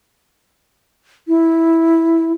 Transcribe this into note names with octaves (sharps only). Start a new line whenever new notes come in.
E4